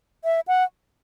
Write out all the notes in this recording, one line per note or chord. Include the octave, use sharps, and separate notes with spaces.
E5
F#5